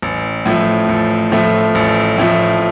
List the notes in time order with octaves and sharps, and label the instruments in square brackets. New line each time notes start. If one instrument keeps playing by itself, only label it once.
[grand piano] A1
A2 F3 A3
A1
A2 F3 A3
A1
A2 F3 A3